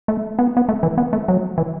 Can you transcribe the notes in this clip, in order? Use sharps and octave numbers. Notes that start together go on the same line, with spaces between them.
A3
B3
B3
A3
E3
B3
A3
F#3
E3